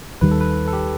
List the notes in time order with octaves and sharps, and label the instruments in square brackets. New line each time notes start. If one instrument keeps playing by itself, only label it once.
[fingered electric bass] D#2 D#3 G3 [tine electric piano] B4
[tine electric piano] A4
B4
A4
G4